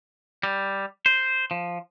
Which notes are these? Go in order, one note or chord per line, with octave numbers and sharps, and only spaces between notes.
G3
C5
F3